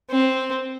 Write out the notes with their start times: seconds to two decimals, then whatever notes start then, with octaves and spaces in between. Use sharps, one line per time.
0.10 C4